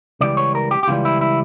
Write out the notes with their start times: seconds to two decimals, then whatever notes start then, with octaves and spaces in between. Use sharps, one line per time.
0.21 C#2 C#3 E3 G3 D5
0.37 C#5
0.55 A#4
0.71 G4
0.83 G4
0.88 C#2 C#3 E3 G3 F4
1.05 E4
1.21 E4